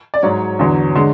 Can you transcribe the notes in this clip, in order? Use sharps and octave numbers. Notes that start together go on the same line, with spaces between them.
D5
G#2 F#3 C#5
E2 D3 F#3
D3 G#3